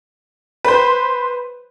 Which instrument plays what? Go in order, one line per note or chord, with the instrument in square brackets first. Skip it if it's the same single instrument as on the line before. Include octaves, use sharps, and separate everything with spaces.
[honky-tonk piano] B4 C5